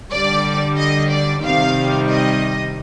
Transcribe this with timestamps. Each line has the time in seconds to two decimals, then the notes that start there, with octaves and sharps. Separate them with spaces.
0.11 D3 G3 D5
0.77 D#5
1.11 D5
1.42 C3 D#3 G3 F5
2.09 D#5